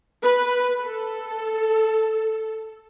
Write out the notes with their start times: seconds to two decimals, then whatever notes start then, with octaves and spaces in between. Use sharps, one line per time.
0.23 B4
0.80 A4